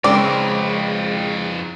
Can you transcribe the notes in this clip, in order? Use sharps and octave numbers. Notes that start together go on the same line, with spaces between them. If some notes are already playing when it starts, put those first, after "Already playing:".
F2 C#3 G#3 B3 C4 A#4 D5